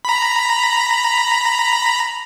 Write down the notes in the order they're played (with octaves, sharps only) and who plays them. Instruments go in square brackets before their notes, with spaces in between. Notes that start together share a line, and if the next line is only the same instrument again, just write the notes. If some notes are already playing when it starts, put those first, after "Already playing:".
[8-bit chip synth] A#5 B5